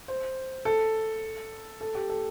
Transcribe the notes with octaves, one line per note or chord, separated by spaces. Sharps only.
C5
A4
A4
G4
A4